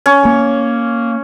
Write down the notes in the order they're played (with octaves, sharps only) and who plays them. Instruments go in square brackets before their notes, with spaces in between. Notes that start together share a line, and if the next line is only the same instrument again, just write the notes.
[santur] C#4
[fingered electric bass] A#3